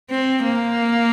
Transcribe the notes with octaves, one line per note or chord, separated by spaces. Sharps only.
C4
A#3